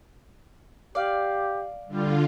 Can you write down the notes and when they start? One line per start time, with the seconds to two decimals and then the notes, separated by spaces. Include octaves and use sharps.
0.95 G4 D5 F5
1.88 D3 G3 F4